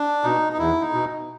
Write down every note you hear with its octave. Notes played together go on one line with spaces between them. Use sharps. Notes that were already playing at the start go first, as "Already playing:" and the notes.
Already playing: D4
B2 D#4
D#4
E2 E4
D#4
B2